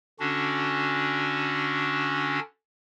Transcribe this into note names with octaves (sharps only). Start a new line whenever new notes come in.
D3 C#4 D4 F#4